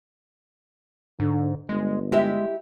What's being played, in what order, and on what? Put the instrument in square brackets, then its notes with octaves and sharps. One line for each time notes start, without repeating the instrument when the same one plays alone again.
[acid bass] G#2 [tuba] D3
[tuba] G1 [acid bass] G#3
[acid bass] G#3 [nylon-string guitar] E4 G4 E5